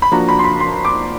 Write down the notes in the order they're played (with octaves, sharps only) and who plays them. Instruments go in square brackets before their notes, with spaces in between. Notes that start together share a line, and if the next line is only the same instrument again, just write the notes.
[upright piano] B5
[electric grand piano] F3 A#3 D4 F#4 [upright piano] A#5
[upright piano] B5
C6
B5
C6
D6